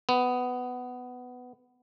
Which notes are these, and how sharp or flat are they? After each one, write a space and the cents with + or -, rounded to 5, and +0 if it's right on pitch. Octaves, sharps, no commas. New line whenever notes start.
B3 +15